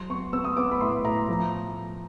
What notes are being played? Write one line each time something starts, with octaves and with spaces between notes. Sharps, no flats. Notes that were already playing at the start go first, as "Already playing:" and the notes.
Already playing: F#3 C6
B3 C#6
B3 E6
D#6
B3 D6
B5
A2 C6
A2 A#5
F3